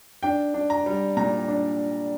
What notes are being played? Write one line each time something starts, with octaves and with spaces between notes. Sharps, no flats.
D4 G5
D4
A#5
G3
A#2 A#5
D4